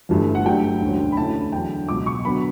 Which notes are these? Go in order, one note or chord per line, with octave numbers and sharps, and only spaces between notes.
G1 G2 E3 A3
F#5
G2 F#3 A3 D4 G5
E1 D2 D3 F#3 C#4
B5
D2 D3 A3 C#4 E4 A5
E2 D3 F#3 G5
C#2 B2 F#3 D6
C#6
D3 F#3 B3 B5